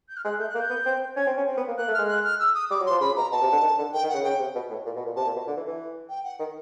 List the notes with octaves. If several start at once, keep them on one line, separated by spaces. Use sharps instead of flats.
G6
F6
G#3 F#6
A3 G6
F#6
A#3
G6
B3
C4
C#4 G#6
C4
C#4
C4
B3
A#3
A#3 F#6
A3
G#3 F6
F#6
F6
E6
D#6
G3 D6
F#3
F3 C6
C#3 B5
B2 A#5
B2 A5
C3
D3
D#3
D3
D#3 G5
D#3
F#5
C#3
C#3 G5
C3
B2
A2
A#2
B2
A#2
C3 A5
A#2
B2
D3
E3
E3
G5
F#5
D#3